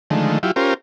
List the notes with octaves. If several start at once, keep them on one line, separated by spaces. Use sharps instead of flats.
D3 D#3 F3 G#3 A3
F#3 E4 F4 G4
C#4 F4 G4 A#4 C5